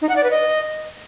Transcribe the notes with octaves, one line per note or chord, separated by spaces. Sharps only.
D#4
F#5
D5
B4
D#5